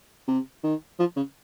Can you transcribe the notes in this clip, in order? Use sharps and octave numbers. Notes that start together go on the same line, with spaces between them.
C3
D#3
F3
C#3